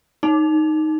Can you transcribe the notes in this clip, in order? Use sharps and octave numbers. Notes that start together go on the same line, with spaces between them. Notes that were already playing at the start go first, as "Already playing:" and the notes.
D#4